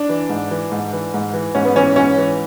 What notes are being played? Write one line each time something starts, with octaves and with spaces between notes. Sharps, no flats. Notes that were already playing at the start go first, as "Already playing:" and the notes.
Already playing: D4
E3
G#2
E3
G#2
E3
G#2
E3
G#2 C#4
B3
E3 C#4
G#2 C#4
E3